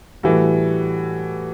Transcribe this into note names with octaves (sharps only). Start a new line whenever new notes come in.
A2 E3 G3 F#4 A4